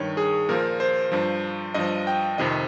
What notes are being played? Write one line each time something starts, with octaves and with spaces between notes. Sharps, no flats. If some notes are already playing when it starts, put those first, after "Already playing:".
Already playing: G2 D#3 C#5
G#4
A#2 F3 A#4
C5
G2 F3
G2 F3 D#5
G5
F2 C3 D#3 D#5